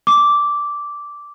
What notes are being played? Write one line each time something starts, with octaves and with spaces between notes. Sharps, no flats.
D6